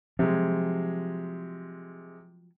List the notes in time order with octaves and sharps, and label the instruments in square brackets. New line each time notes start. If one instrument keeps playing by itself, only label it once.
[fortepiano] C3 G#3 [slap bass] F3 F#3